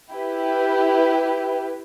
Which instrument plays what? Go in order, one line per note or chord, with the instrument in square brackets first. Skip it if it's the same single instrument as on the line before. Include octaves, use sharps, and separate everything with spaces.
[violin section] E4 G4 B4